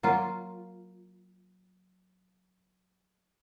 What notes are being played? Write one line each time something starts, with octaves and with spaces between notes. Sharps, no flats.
F#3 A#3 F4